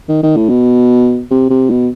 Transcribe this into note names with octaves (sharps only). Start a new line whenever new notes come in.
D#3
D#3
A2
B2
C3
C3
B2